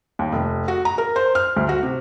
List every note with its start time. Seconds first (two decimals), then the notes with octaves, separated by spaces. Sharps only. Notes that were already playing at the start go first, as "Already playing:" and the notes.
0.19 D#2
0.32 F1
0.68 F#4
0.85 A#5
0.98 A#4
1.16 C5
1.35 F6
1.56 D2
1.69 F#4
1.83 C3